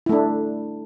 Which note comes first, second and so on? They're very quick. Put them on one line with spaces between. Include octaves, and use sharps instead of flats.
E4 A3 D4